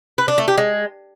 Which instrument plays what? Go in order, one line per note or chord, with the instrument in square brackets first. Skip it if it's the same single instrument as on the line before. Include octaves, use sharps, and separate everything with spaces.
[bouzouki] B4
D4
A3
G4
G#3